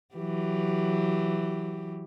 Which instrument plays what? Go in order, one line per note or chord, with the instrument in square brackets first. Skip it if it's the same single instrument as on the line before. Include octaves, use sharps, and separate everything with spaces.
[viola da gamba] E3 F#3 G4